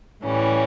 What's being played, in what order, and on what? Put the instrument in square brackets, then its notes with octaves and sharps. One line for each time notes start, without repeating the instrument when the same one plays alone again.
[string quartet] A2 E3 G3 C#4